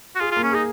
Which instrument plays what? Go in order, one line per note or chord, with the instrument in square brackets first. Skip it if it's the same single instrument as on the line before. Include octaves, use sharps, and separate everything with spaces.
[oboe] F#4
[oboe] F4 [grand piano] G#4
[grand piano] A#3 [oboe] F4
[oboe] C#4
[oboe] D#4 [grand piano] G#4